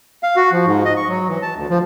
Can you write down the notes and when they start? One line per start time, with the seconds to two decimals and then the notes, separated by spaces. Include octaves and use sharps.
0.23 F5
0.36 F#4
0.52 F3
0.66 G#2
0.85 D#5
0.96 C#6
1.08 F#3
1.29 E3
1.42 A5
1.56 D2
1.70 F3